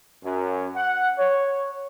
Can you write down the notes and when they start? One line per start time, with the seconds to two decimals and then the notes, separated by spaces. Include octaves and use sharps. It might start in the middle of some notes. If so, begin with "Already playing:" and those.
0.24 F#2
0.76 F#5
1.18 C#5